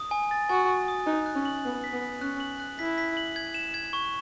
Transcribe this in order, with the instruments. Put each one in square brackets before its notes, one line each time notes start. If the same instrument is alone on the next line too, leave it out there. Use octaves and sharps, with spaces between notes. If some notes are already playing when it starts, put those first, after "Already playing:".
Already playing: [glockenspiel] D#6
G#5
A6
[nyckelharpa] F#4 [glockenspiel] G#5
[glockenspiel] G#5
D#6
[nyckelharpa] D#4 [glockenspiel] F#6
[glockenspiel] F#6
[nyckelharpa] C#4
[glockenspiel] F#7
[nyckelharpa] B3 [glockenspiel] F#6
[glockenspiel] B6
[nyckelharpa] B3
[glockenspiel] B6
[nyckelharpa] C#4 [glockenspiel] F#6
[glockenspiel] F#7
F#6
[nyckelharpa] E4 [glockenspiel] B6
[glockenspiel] B6
F#7
G#6
E7
G#6
C#6